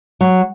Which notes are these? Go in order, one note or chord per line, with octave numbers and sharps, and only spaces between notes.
F#3